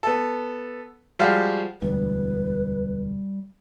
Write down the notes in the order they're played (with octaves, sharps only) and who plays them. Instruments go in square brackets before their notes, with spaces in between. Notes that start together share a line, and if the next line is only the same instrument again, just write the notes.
[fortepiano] B3 A4
F3 G3 G#3 F#4 G4 F5
[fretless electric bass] E1 D2 [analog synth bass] G3 [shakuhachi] B4